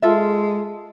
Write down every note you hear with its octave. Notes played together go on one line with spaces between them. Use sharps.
G#3 F4 A4 E5